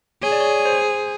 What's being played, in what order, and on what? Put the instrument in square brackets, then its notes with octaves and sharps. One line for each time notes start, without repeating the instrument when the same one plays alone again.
[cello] G#4 [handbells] C#5
[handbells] D5
C#5
C5